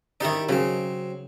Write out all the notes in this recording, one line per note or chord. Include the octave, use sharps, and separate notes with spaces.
D#3 D#4 E4 G4 D5
C#3 F#3 C4